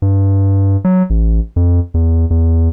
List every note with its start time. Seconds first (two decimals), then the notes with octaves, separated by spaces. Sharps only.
0.02 G2
0.85 F#3
1.10 A1
1.56 F2
1.94 E2
2.30 E2